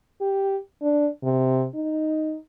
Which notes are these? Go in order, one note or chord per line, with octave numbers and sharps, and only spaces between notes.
G4
D4
C3
D#4